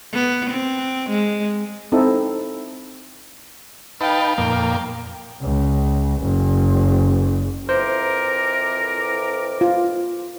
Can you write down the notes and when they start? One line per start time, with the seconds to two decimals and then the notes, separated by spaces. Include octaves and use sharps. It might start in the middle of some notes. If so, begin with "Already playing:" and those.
0.13 B3
0.50 C4
1.10 G#3
1.92 C4 D#4 E4 A4
4.01 D#4 B4 F5 G5 A5
4.38 F2 A#2 A#3
5.41 C#2
6.22 F#1
7.69 F2 E3 A#4 C5 D6
9.61 F4